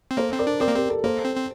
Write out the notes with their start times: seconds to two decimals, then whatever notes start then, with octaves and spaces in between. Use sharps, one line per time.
0.11 C4
0.17 A#3 A4 C5
0.32 C4
0.39 A#4 D5
0.47 D4
0.60 C4 A#4 D5
0.68 A#3
0.75 C4 G4 A#4
0.90 A4
1.04 A#3 A4 C5
1.25 C4
1.36 C4